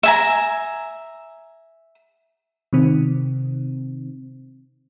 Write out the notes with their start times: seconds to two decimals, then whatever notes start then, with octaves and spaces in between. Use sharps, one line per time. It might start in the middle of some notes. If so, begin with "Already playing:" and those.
0.03 E5 G#5 A#5
2.73 C3 D#3 C4